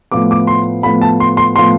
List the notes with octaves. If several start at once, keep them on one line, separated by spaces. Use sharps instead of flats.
A2 F3 B3 D6
D6
C6
A2 F3 B3 B5
A5
C6
C6
A2 F3 B3 C6